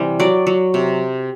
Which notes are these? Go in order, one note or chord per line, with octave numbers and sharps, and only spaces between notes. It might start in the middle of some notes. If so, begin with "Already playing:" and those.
Already playing: C3 E3 G3
F#3 D5
F#3
C3